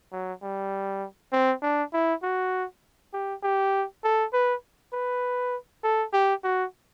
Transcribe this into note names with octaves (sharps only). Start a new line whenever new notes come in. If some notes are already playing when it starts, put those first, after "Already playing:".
F#3
G3
C4
D4
E4
F#4
G4
G4
A4
B4
B4
A4
G4
F#4